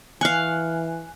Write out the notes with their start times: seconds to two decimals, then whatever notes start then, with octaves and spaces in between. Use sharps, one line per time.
0.21 E3 F5 G#5 C#6 F#6